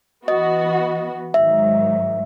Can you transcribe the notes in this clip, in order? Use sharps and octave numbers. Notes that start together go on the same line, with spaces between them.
E3 B3 F#4 D#5
G#2 D#3 F#3 E5